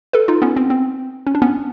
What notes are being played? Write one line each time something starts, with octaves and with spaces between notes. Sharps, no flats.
A4 B4
D#4 F4
B3 C#4
C4
C4
C#4
D4
B3 C#4